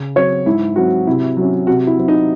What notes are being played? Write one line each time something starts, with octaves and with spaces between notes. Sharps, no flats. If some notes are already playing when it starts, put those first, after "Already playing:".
Already playing: C#3
F#3 C4 C#5
G#2 E4
F#3 C4 F#4
C3 E4
F#3 C#4
C3 F#4
E4
F#3 C4
D#4